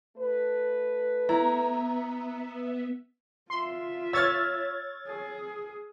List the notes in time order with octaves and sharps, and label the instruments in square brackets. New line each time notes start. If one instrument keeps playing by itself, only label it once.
[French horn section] A3 B4
[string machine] B3 E5 [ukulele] E4 [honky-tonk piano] A#5
[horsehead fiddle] F4 E5 [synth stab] C6
[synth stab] C#5 G#6 A6 [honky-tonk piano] E6 F6
[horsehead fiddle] G#4